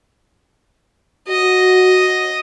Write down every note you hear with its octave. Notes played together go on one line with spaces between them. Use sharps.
F#4 D#5